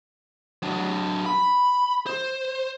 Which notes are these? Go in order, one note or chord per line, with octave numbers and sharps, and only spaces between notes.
F#3 D4
B5
C5